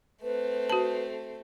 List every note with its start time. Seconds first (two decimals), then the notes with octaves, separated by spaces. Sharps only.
0.23 A3 C4 B4
0.70 F#4 A5